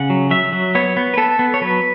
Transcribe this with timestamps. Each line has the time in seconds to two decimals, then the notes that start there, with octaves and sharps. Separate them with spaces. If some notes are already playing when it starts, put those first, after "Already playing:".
Already playing: C#3 F#5
0.10 F#3
0.31 F#3 E5
0.52 F#3
0.75 B3 C#5
0.97 B3
1.14 B4
1.17 B3 A4
1.39 B3
1.54 C#5
1.61 F#3 B4